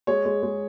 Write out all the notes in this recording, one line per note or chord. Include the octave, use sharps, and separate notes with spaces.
G#3 C#5
G#3
G#3